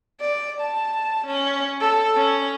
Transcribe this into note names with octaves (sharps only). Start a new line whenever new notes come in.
D5
A5
C#4
A4
C#4